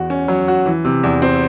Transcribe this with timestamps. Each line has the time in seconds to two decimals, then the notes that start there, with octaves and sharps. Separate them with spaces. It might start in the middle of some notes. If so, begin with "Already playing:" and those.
Already playing: E2 F#4
0.10 C#4
0.28 F#3
0.48 F#4
0.66 E3
0.85 C3
1.03 E2
1.22 C4